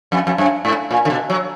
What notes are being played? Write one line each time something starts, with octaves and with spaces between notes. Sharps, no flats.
F2
F2
F#2
G#2
A#2
D3
B2
F#3